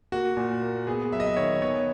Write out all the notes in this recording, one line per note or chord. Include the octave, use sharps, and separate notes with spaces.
A#3 F#4
A#2
A#3
B3 G#4
F#3 E5
D#5
E5
D#3 C#5
B3 C#5